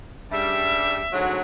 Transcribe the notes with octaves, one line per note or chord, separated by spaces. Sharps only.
G2 C#3 G3 E5
D2 G#2 F#3